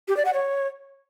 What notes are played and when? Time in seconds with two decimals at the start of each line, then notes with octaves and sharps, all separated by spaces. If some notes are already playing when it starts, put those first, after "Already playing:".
0.08 G4
0.17 D5
0.25 F#5
0.34 C#5